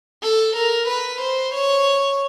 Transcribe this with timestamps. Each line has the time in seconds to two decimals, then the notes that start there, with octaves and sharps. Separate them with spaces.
0.23 A4
0.55 A#4
0.88 B4
1.21 C5
1.55 C#5